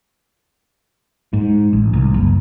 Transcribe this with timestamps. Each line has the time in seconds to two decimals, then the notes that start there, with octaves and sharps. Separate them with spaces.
1.33 G#2
1.73 A1
1.93 C2
2.14 F#1